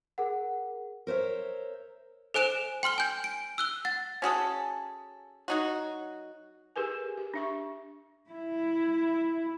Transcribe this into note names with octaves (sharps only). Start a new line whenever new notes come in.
G#4 A#4 F#5
A#4 C5 C#5 E5
A4 C5 G#5 F#6 D7 E7
G5 C6 F6 G7
G#5 G6
D7
E6 F#6 G7
F#5 A6
C#4 F#4 G#4 A4
F#3 D#4 F#4
G4 G#4 A#4 B4 G#5
G4
D4 E5 C#6
E4